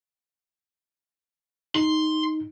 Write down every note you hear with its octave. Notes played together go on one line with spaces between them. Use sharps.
D#4 C6